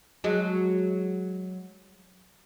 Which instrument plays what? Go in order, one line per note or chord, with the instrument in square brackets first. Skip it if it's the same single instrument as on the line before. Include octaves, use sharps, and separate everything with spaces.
[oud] F#3 G#3